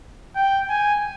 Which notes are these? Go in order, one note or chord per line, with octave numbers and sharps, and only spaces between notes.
G5
G#5